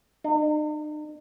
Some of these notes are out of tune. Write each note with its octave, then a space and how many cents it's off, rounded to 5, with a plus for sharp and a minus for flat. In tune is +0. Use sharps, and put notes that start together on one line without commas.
D#4 -45